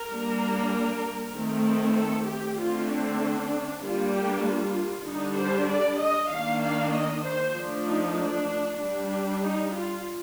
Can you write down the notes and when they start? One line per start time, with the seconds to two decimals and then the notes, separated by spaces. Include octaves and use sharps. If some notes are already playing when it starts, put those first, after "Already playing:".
Already playing: A#4
0.08 G3 A#3 D4
1.33 D#3 A3 C4
1.94 A4
2.26 G4
2.56 D3 A3 C4 F4
2.88 D4
3.81 G3 A#3 D4 F4
4.12 G4
4.43 F4
5.05 D3 G3 D4 D#4
5.37 C5
5.67 D5
5.99 D#5
6.30 D#3 A#3 D4 F5
6.61 F5
6.92 D#5
7.24 C5
7.54 F3 A3 D4
7.85 D#4
8.17 D4
8.79 G3 D4
9.41 D#4
9.72 F4